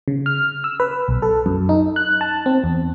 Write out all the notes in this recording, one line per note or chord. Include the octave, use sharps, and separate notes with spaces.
C#3
F6
E6
B4
B1
A4
F#2
D#4
F#6
A5
C4
E2